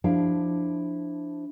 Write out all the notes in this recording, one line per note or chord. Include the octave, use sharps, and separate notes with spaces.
F3 D4 E4 G4 E5 F5